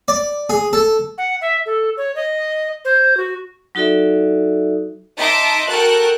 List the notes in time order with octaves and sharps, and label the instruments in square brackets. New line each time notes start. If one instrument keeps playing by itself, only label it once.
[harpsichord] D5
G#4
A4
[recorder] F#5
E5
A4
C#5
D#5
C5
F#4
[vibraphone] F#3 D#4 F#4 A4 D5 E5
[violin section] D#4 D#5 E5 A5 C6 D6
F#4 A4 A#4 G5 A5 F#6